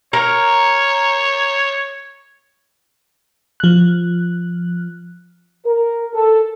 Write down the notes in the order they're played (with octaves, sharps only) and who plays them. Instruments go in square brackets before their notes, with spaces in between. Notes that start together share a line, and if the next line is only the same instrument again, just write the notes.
[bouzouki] A#4 [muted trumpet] C#5
[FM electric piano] F3 F#6
[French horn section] A#4
A4